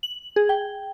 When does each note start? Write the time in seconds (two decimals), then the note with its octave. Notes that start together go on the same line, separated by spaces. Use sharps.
0.03 F#7
0.36 G#4
0.49 G5